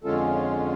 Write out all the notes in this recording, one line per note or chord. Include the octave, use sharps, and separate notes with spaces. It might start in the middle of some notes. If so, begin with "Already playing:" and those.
F2 D3 G#3 C#4 F4 A4